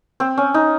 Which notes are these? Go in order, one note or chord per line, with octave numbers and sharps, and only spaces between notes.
C4
C#4
D#4